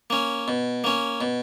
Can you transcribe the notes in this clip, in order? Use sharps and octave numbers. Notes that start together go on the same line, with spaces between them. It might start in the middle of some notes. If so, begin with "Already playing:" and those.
A#3 C#4
B2
A#3 C#4
B2